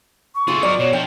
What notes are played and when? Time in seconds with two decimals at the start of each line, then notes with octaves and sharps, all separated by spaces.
0.35 C#6
0.48 A3 F4 G#4
0.63 F#3 A#4 D5
0.79 B2 C#5
0.93 F3 D4 G5